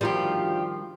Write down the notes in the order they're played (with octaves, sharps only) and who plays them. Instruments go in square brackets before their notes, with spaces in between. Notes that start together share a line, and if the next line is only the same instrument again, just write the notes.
[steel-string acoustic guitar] D2 F4 G4 [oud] D#3 F3 G3